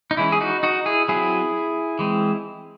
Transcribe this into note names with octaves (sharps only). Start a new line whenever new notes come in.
D#4
E3 G#3 C#4 E4
G#4
D#4 F#4
D#4 F#4
E4 G#4
F#3 C4 E4 G#4
E3 G#3 C4